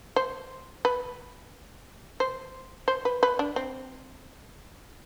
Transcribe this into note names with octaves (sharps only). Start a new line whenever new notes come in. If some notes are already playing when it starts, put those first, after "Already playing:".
C5
B4
C5
C5
B4
B4
D4
C4